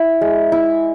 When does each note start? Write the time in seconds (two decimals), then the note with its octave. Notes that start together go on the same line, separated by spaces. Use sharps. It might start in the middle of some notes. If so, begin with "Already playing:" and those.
Already playing: E4
0.21 G#3
0.52 E4